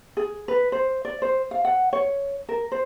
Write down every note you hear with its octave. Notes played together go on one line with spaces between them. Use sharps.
G#4
B4
C5
D5
C5
F5
F#5
C#5
A#4
C5